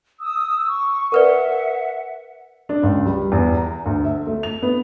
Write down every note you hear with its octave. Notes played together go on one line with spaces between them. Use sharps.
D#6 E6
C#6
A#4 B4 D5 E5 F#5
D4
C#2
G3
E2
A#5
D2
E5
A3
F7
B3